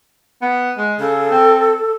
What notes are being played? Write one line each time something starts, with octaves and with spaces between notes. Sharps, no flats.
B3
G#3
C#3 A4
C4